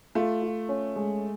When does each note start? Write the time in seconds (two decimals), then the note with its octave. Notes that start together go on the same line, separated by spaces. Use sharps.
0.15 A3 F4
0.42 F4
0.69 C#4
0.96 G#3